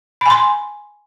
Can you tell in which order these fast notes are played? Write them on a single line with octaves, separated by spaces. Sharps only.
B5 G#5 C6